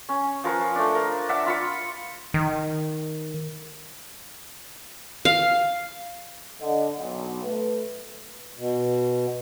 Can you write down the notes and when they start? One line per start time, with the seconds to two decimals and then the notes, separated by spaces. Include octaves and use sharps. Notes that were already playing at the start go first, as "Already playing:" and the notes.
0.09 C#4
0.44 F3 A#4 B4 C#6
0.76 A3 D4
0.95 A#4
1.29 D4 E5 F#5
1.46 F4 B5 C#6
2.34 D#3
5.25 F5
6.60 D3 D4 D#5
6.97 B1
7.43 A3 B4
8.57 B2